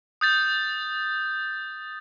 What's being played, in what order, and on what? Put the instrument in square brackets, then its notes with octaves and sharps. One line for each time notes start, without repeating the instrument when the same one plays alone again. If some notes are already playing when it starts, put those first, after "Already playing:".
[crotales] D#6 G6 A6